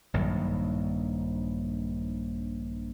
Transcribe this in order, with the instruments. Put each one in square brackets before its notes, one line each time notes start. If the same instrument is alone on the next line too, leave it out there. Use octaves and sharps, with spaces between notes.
[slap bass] A#1 G2 D#3 F#3